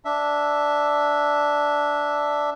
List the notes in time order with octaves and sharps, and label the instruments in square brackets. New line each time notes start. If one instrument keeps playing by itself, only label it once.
[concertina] D4 E5